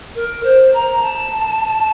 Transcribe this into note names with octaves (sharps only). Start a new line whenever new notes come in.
A#4
C5
A#5
A5